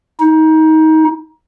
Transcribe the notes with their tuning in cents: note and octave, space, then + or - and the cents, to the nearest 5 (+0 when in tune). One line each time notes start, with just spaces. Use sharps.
D#4 +25